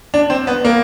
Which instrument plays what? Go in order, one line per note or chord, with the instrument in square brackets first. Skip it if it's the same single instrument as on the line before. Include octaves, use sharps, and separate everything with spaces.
[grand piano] D4
C4
B3
A#3